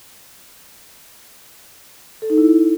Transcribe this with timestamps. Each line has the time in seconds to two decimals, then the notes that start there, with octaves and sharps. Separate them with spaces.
2.22 A4
2.30 D#4
2.38 E4